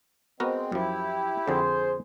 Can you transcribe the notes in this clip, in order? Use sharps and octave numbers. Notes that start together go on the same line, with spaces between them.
G#3 B3 C4 F#4 A#4
F#2 F3 E4 G4
F2 D3 G#4 C5